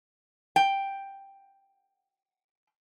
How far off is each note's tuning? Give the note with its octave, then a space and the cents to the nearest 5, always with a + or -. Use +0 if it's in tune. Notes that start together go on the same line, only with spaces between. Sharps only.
G5 +5